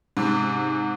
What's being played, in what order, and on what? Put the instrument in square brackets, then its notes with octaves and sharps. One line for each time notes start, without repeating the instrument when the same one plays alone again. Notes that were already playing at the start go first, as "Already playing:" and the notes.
[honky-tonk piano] G#2 C3